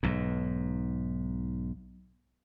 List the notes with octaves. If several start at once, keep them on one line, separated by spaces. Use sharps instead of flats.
B1 G#2